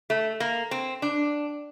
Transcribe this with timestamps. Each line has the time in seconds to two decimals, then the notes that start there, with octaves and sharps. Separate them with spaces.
0.10 A3
0.40 A#3
0.71 C4
1.02 D4